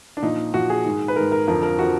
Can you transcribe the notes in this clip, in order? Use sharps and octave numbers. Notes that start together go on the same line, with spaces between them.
D4
A#2 F3 D#4
A#2 F3 F#4
G#4
G#2 D#3
B4
G#2 D#3 A#4
A#4
F2 D3 F3 A#4
A#4
D3 F3 F#4